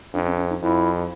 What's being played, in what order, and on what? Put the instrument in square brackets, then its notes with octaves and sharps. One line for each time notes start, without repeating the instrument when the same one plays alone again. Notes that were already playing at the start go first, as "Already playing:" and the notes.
[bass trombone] F2 [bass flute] D4
[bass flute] C#4
C#4
D#4
[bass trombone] F2 [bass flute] E4